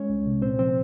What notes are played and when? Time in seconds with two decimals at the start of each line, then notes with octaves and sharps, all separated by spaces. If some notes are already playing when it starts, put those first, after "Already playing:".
Already playing: G#3 C#4 C#5
0.09 C2
0.26 C3
0.42 A#2 C4 C5
0.59 F3 C4 C5